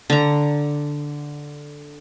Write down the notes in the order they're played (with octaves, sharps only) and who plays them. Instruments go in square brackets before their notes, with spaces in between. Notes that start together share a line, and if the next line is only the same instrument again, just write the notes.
[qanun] D3 A#5